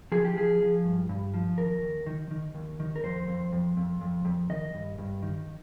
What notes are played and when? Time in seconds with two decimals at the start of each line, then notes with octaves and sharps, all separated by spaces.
0.12 F3 G#4
0.25 G4
0.36 F3 G#4
0.61 F3
0.85 G2
1.09 G2
1.34 F3
1.58 D#2 A#4
1.82 D#2
2.07 D#3
2.31 D#3
2.55 D#2
2.80 D#3
2.96 A#4
3.03 F2 C5
3.28 F2
3.52 F2
3.77 F2
4.01 F2
4.25 F2
4.50 D#3 D#5
4.74 G2
4.98 G2
5.23 D#3